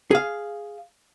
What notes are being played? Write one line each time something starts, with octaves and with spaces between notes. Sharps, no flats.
G#4 F5